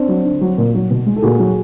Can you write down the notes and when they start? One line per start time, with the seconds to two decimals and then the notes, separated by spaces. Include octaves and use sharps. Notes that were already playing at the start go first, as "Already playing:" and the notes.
Already playing: C4 D4
0.08 F#3
0.25 D3
0.41 F#3
0.58 A#2
0.74 F#3
0.91 B2
1.06 G#3
1.16 A4
1.22 A#2 F#4 G#4
1.39 F#3